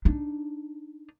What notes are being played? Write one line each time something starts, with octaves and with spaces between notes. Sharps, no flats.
D4 D#4